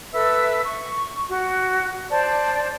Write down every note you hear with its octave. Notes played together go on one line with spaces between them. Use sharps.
A4 B4 E5 E6
C#6
F#4
C5 D5 A5